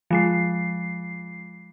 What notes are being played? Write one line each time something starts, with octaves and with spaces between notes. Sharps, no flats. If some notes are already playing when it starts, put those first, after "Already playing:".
F3 G#3 C7